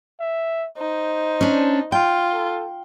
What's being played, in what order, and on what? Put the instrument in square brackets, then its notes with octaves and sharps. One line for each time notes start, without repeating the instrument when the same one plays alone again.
[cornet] E5
[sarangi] D#4 [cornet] C5
[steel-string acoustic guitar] C#4 D4
[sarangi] F4 [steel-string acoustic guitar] G5
[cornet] A4